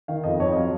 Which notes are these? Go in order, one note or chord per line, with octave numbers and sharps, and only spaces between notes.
D#3 F5
F2 D#5
F2 C#5
D#5
F#3 F5